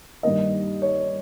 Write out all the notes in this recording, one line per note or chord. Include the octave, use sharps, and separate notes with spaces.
G2 D#3 A#3 D#5
C#5